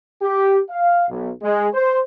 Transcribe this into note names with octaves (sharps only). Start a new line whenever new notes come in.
G4
F5
B1
G#3
C5